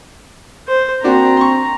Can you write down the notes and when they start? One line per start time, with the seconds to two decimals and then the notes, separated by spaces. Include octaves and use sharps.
0.68 C5
1.03 A#3 C4 D4 F#4 A#5
1.37 C6 C#6